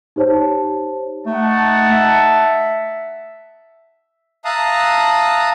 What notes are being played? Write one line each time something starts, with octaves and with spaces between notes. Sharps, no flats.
D#4 G4 C5 C#5 A5
A3 D#4 F#5 A5
E5
E5 F5 A5 A#5 D#6 F#6